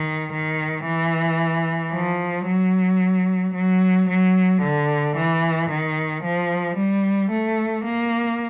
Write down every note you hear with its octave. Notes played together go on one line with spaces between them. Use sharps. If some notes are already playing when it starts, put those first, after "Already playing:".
Already playing: D#3
D#3
E3
F3
F#3
F#3
F#3
D3
E3
D#3
F3
G3
A3
A#3